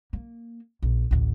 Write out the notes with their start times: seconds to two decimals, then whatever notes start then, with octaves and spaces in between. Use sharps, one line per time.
0.13 A#3
0.82 A#1
1.11 A1 D2